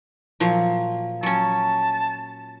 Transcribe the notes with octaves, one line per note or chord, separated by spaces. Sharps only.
A#2 F3 F#3
F#3 C#4 A5